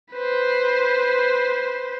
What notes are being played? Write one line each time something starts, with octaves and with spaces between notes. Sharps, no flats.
B4 C5